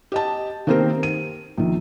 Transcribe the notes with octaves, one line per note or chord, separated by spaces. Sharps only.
G4 D#5 A5
D#3 A#3 C4 G4 A#4 C5
D#7
A#1 D#3